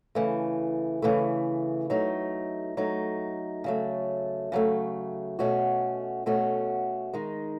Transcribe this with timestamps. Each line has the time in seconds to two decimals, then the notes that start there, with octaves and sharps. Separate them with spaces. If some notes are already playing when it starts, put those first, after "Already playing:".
0.15 C#3 E3 A3
1.02 C#3 E3 A3
1.90 F#3 A3 D#4
2.77 F#3 A3 D#4
3.64 C#3 F#3 A3
4.52 C#3 F#3 A3
5.39 B2 A3 C#4 F#4
6.26 B2 A3 C#4 F#4
7.13 D#3 G#3 D#4